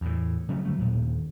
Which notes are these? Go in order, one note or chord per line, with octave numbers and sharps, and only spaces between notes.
E2 A2
C#3 F#3 A3 C#4
D3 F#3 A3
D#1 G2 A#2